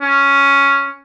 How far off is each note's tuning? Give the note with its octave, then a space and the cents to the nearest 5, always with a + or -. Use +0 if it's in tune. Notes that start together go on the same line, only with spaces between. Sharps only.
C#4 +5